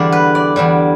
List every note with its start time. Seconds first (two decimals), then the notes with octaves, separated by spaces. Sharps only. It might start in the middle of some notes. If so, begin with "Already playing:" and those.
Already playing: E2 D3 G3 D5
0.12 B4
0.35 D5
0.56 E2 D3 G3